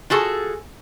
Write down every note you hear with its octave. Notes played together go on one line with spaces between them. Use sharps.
F4 F#4 G#4 A4